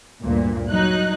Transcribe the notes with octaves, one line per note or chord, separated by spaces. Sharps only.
D2 G2 A#2
F#3 D#4 F#6